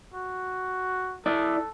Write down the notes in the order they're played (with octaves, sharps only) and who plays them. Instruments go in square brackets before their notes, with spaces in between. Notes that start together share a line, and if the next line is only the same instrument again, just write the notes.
[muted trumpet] F#4
[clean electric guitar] E4 D5 [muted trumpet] A4